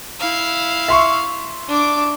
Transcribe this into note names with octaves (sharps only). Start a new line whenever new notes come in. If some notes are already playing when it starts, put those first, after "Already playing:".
E4 F5
E5 C6 C#6
D4 D6